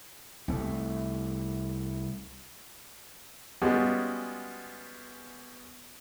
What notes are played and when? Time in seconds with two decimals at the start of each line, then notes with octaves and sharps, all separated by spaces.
0.48 C2 A3
3.62 G3 G#3 B3 C#4 F4 F#4